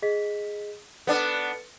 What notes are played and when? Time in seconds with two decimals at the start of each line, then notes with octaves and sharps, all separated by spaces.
0.02 G#4 D#5 B6
1.07 B3 D4 A4 B4 F6